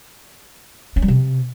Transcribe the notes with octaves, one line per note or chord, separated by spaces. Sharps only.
C#4
G3
C3